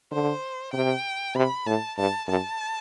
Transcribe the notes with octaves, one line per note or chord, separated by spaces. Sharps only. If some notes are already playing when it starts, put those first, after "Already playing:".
D3 C5
C3 G5
C3 B5
A2 A5
G2 A5
F#2 A5